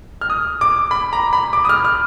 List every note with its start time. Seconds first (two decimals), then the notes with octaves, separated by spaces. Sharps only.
0.21 F6
0.30 D#6
0.61 D6
0.91 B5
1.13 A#5
1.33 B5
1.53 D6
1.65 D#6
1.69 F6
1.85 F6